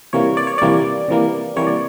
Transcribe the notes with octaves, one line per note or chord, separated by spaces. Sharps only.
C3 E3 G3 A#3 C#5
D5
C#5
C3 E3 G3 A#3 D5
C3 E3 G3 A#3
C3 E3 G3 A#3 C#5
D5